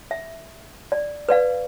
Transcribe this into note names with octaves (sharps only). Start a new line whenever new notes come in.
E5
D5
B4 D5 F5